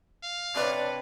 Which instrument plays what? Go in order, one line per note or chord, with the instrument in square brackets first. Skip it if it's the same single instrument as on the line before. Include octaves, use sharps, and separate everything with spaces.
[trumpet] F5
[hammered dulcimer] C3 D4 A5 [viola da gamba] B4 C#5 [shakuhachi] D5